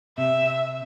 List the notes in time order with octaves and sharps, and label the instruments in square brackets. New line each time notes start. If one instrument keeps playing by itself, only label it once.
[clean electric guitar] C3 [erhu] E5